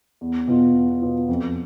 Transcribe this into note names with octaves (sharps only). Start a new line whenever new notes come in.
E2
B2 B3 F4
E2
B2 B3 F4
F2